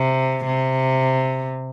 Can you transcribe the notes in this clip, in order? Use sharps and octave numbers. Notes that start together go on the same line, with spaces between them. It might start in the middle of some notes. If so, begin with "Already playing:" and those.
Already playing: C3
C3